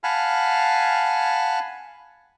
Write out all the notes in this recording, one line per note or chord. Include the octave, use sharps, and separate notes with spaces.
F5 F#5 G#5 A5 B5 F6